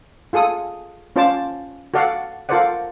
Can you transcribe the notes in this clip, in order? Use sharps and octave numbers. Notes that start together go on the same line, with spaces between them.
F4 G#4 A4 D#6
C#4 F4 C5 D5 A5 D6
F#4 A4 D5 F5 F#5
F4 A4 A#4 C5 D5 F#5